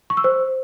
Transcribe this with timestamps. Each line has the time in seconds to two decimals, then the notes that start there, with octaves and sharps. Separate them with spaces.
0.10 C#6
0.17 E6
0.24 C5